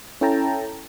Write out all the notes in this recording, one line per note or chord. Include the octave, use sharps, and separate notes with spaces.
C#4 E4 A4 G5 A5 A#5